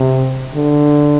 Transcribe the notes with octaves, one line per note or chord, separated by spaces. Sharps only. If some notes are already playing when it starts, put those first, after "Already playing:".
Already playing: C3
D3